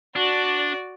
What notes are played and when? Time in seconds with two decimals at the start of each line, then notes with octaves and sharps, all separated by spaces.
0.16 D4 F#4 D5